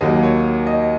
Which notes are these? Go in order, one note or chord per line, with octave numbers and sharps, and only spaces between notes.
D#2 D#3 F#3 A#3 D#5
C#5
D#5